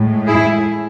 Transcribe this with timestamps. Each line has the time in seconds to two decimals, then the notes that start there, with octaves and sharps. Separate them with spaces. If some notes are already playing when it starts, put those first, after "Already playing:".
Already playing: A2 G#3
0.27 E4 G#4